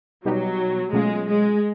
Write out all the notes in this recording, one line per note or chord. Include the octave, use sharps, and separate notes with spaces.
B2 F#3 G3 B3 D#4 G4
B2 F#3 G#3 A3 C#4 F4
G#3